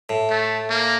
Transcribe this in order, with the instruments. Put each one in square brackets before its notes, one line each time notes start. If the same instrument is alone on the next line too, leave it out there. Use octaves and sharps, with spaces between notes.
[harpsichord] A2
[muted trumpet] A3
A#3